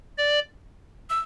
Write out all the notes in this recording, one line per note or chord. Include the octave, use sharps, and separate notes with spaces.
D5
E6